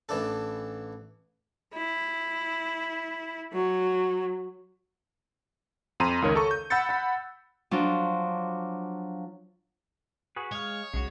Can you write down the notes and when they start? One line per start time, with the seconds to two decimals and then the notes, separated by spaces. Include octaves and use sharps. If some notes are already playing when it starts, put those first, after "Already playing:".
0.09 A1 E3 D4 A4
1.74 E4
3.53 F#3
6.00 F2 A#5 C6 D#7
6.22 C#2 D#3 A#4 C#5
6.35 A4 A#5 C#6
6.51 G6
6.70 F#5 B5 E6 G6 A6 C#7
6.89 F#5 B5
7.71 F3 F#3 D4
10.36 F#4 G#4 B4
10.52 G#3 C#5 F5
10.94 B1 C#3 G#3 F#4